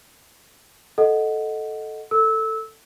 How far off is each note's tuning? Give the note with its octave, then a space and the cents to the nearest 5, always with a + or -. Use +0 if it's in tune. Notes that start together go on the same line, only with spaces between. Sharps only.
A4 -5 D#5 +0 F#5 +0
A4 +15 E6 -20